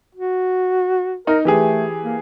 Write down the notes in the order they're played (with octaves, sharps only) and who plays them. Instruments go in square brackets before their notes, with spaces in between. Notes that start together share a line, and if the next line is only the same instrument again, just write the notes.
[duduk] F#4
[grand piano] D#4 [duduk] A#4
[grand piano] E3 G4 G#4 [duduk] A3
[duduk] A#3